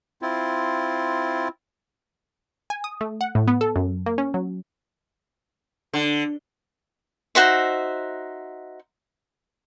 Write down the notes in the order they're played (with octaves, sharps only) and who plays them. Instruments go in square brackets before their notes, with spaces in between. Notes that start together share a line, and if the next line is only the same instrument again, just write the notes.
[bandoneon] C4 E4 F4
[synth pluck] G#5
D#6
A3
F#5
A2
B3
A4
F#2
A#3
C#4
F#3
[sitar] D3
[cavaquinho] D#4 F#4 C5 E5